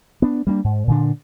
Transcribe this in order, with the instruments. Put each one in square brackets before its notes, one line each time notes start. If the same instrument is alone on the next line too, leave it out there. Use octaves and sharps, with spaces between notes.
[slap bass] B3 D4
G3 A#3 C4 D4
G#2
A#2 D3 D4